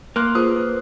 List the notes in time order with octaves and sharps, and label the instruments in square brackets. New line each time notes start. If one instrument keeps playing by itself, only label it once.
[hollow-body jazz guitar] A#3 [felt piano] C6 F#6
[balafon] F4 G#4 [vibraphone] B4 C5 [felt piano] D#6